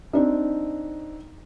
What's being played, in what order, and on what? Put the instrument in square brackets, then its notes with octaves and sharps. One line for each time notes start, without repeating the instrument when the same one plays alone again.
[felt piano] C4 D4 D#4